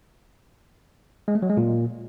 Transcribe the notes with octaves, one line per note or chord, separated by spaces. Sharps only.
G#3
A3
F#3
G#3
A#2